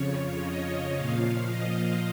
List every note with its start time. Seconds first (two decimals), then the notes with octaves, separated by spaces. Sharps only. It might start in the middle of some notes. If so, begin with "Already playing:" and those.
Already playing: F2 C#3 F3 C#5
0.41 D#5
0.95 A#2 F3 F5
1.49 D#5